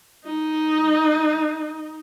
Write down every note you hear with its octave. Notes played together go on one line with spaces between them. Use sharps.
D#4